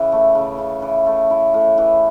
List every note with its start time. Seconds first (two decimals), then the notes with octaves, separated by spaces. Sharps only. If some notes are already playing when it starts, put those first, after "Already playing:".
Already playing: C#3 E3
0.12 A3
0.35 C#3
0.58 C#3
0.82 E3
1.06 A3
1.31 E4
1.54 A2
1.78 E3